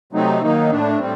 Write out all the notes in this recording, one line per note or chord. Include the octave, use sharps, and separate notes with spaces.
C3 F#3 A3 C4 D#4
D#3 F#3 A#3 D#4
A2 A3 D4
A2 G3 C4